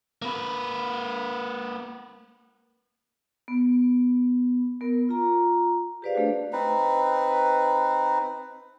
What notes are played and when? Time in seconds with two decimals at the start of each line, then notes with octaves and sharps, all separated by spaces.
0.22 A#3 B4
3.48 B3
4.81 B3 A#4
5.09 F4 A#5
6.02 G4 G#4 B4 C5 D5 F5
6.15 A3 D4 F#4
6.53 C4 D#4 B4